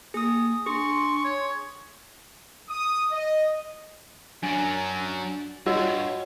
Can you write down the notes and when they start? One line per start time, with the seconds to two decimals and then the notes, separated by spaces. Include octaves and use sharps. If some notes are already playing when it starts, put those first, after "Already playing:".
0.14 A#3 G#4 D#6
0.66 D4 G#4 C6 C#6
1.24 C#5
2.69 D#6
3.12 D#5
4.43 F#2 F#3 D4 G#5
5.67 G2 F4 F#4 C#5 D#5 F#5 E6